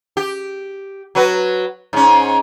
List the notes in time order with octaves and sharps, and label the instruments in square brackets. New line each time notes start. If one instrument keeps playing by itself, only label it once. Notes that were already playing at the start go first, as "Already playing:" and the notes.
[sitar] G4
F#3 F#4 B4
G#2 C#4